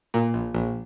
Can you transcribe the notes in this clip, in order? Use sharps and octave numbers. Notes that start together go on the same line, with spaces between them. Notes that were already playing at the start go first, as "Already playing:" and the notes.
A#2
A#1
A#1